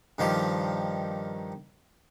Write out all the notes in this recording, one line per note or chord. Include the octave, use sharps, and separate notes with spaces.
G2 D#3 F3 G4